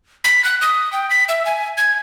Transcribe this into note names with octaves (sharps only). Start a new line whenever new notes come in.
B6
F#6
D#6
G5
B6
E5
G#5
G#6